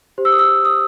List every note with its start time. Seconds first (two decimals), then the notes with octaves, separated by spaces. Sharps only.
0.18 G4 C5
0.25 E6
0.32 D#6
0.39 E6
0.65 D#6